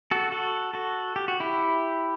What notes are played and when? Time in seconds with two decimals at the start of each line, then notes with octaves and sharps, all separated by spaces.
0.11 F#4 A4
0.32 F#4 A4
0.74 F#4 A4
1.16 G4
1.28 F#4
1.40 E4 G4